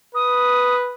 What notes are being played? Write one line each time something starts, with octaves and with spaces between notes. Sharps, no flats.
B4 D#6